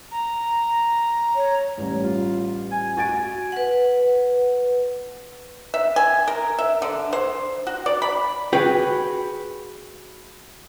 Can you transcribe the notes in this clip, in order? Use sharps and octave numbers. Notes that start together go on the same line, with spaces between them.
A#5
C#5
A1 G3
F4
G#5
F#4 G#5 A6 D7
B4 F#5
E5
G#5
A#4
E5
D3
C5
F#4
D5
B5
F#4 G#4 B4 G5